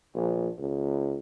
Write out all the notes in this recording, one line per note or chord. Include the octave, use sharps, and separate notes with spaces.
A#1
C#2